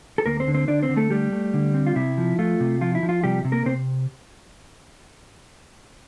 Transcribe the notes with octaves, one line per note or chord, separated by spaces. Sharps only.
A4
D2 A#3 A#4
C4 C5
D3
C4 C5
D3 D4 D5
C4 C5
D3
A3 A4
G3 A3 G4
A3
D3
C4
F4
C3 E4
F3
A3 F4
C3
F3 F4
E4
F3
F4
C3 G3 G4
C3
A#3 A#4
C3 C4 C5